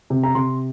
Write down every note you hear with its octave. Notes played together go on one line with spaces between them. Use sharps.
C3
A#5
C3 C6